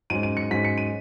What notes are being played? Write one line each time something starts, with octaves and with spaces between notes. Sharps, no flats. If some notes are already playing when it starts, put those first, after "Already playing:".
G#2 F#3 C#4 D#7
D#7
C#7
G#2 F#3 C#4 B6
C#7
D#7